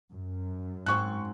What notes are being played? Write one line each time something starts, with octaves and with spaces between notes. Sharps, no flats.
F#2
G#2 C4 C#6 F#6